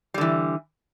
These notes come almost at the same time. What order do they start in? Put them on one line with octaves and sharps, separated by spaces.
G3 D3 E3